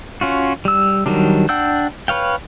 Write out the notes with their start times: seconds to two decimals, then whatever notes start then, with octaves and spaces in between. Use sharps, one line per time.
0.21 C#4 F4 F#4
0.65 G3 E6
1.06 D#3 F#3 G3 D4
1.49 D4 F#5 G5 E6 G6
2.08 B4 C#5 F5 G5